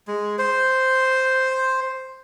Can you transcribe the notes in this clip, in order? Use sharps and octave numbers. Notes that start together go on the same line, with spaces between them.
G#3
C5